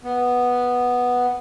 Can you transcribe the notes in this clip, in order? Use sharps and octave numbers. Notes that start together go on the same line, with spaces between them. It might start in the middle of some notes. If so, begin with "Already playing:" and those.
B3